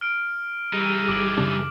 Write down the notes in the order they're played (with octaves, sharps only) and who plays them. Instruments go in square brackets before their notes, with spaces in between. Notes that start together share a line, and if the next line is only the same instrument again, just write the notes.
[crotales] F6 D7
[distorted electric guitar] E3 D#4 [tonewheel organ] G3 G#4
[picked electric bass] G1 [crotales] D6 D7 F#7
[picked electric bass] F#2 C#3 D4